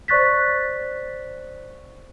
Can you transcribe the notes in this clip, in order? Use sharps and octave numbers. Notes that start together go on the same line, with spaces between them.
C5 D5 C#6 F#6 A6 B6